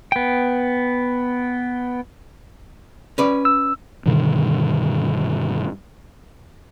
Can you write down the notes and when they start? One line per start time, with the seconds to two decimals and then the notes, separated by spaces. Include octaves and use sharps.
0.12 B3 G5
3.18 C#4 B4 D5
3.45 E6
4.06 G2 B2 D3 D#3